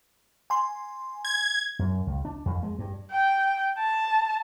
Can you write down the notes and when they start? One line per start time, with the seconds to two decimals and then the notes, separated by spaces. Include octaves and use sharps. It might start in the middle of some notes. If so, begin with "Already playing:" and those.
0.50 G#5 C6
1.25 G#6
1.79 F#2
2.07 C#2
2.25 D4
2.46 F2
2.63 G#3
2.79 G2
3.11 G5
3.79 A5